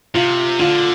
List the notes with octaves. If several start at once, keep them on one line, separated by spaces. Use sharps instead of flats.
C3 F4
D3 F4